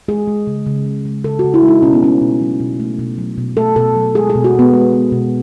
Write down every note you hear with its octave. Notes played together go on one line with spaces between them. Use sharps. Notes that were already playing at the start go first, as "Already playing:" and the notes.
G#3 G#4
G#3
C#3
C#3
G#3
G#3
C#3 A4
F#4
C#3
E4
G#3
D#4
B2 C#4
B3
A3 C#4
B2
F#3
B2
A3
B2
F#3
B2
A3 A4
B2 A4
F#3
G#3 G#4
G#4
B2
F#4
B2 B3
G#3
G#3
B2